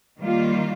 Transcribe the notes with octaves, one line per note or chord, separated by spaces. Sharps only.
D#3 G3 A#3 F4